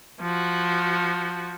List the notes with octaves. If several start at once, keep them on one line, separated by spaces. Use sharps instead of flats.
F3 F#4